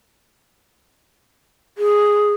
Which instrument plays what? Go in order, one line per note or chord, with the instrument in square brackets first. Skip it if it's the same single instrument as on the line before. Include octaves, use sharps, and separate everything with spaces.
[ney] G#4